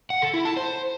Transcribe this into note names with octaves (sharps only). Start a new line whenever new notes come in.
F#5
A4
E4
A5
C5